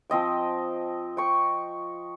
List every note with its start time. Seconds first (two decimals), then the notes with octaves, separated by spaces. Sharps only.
0.10 F3 C4 D#5 G5
1.17 G5 C#6